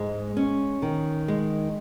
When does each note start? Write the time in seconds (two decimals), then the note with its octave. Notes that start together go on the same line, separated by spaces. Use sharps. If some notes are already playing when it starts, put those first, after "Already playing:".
Already playing: G#2 G#3
0.37 C#4
0.82 D#3
1.28 G#3